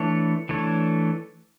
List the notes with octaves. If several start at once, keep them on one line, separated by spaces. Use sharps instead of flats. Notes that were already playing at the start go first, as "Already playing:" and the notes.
Already playing: E3 A3 D4 A4 C#5
E3 A3 D4 A4 C#5